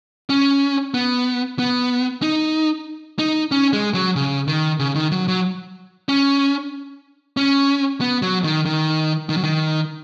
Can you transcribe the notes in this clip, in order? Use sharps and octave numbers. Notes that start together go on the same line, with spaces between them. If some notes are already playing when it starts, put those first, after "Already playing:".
C#4
B3
B3
D#4
D#4
C#4
G#3
F#3
C#3
D#3
C#3
D#3
F#3
F#3
C#4
C#4
B3
F#3
D#3
D#3
D#3
F#3
D#3